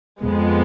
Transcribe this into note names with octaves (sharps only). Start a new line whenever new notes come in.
F2 F3 G#3 B3